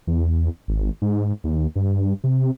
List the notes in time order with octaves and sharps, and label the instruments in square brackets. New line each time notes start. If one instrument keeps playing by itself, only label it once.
[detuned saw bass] E2
G#1
G#2
D#2
G2
C3